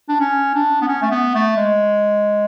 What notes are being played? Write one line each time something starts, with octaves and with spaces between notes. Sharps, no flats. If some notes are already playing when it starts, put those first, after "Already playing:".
D4
C#4
D4
B3
C#4
A3
B3
A3
G#3